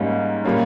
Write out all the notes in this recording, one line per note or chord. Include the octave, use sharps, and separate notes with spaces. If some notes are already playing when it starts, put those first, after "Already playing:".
Already playing: G#2 G3 A#3 C#4
A#2 G3 A#3 C#4